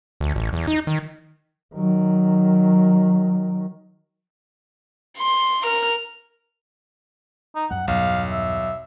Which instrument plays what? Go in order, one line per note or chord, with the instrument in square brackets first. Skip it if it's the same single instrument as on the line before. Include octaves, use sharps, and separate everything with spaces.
[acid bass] D2
A1
E2
D#4
D#3
[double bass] D#3 F#3
[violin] C6
A#4 F6
[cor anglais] D#4
[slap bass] F#2 G3 [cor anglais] F#5
[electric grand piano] B1 [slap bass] E2 G2 [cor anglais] F5
[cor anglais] E5